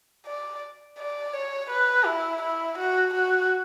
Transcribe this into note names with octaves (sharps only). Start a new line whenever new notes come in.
D5
D5
C#5
B4
E4
E4
F#4
F#4